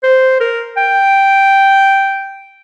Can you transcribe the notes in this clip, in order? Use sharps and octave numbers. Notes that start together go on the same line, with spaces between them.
C5
A#4
G5